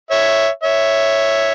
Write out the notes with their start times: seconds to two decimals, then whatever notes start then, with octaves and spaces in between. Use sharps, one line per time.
0.11 C#5 E5
0.63 C#5 E5